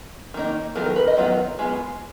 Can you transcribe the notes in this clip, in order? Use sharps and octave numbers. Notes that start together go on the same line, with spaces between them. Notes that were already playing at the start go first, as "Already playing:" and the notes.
D#3 A#3 D#4
D#3 F#3 B3 F4 A#4
A#4
B4
D#5
D#3 F#3 B3 F4
G#3 B3 F4 G#4